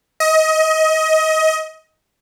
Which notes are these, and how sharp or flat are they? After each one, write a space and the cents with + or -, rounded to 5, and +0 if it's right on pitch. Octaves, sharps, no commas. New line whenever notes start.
D#5 +25